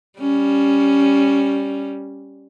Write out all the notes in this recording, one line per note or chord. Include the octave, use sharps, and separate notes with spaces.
G3 C#4